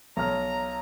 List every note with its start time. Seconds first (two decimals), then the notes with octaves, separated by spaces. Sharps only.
0.17 B1 A#5 F6